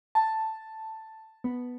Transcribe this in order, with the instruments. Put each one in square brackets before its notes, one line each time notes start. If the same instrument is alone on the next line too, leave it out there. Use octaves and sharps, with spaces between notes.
[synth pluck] A5
B3